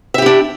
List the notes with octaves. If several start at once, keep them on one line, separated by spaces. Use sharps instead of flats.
D4 E4 G4 E5